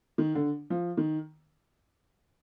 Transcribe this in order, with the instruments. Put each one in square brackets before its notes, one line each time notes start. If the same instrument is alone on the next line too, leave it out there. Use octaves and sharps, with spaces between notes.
[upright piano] D#3
D3
F3
D#3